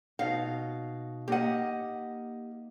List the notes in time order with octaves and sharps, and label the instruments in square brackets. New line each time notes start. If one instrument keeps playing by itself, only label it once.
[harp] B2 D#4 [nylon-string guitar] F5
[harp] A#3 A#4 D#5 [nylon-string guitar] G4 F#5